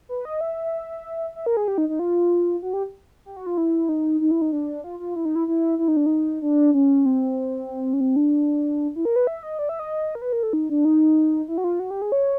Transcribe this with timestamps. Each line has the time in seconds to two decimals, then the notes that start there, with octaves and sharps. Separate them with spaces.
0.09 B4
0.25 D#5
0.41 E5
1.36 E5
1.46 A#4
1.57 G#4
1.68 G4
1.78 D#4
1.89 D#4
1.99 F4
2.62 F#4
2.73 G4
3.26 G4
3.36 F#4
3.46 F4
3.58 E4
3.89 D#4
4.21 D#4
4.31 E4
4.42 D#4
4.52 D4
4.84 F4
4.99 F4
5.16 E4
5.25 D#4
5.35 E4
5.48 E4
5.79 E4
5.88 D#4
5.97 D4
6.06 D#4
6.42 D4
6.74 C#4
7.06 C4
7.93 C#4
8.00 C4
8.16 D4
8.96 E4
9.05 A#4
9.16 B4
9.27 E5
9.43 D#5
9.59 D5
9.69 E5
9.79 D#5
10.15 A#4
10.22 B4
10.33 A#4
10.43 A4
10.53 D#4
10.69 D4
10.85 D#4
11.48 E4
11.58 F#4
11.64 F4
11.80 F#4
11.91 G4
12.02 G#4
12.12 C#5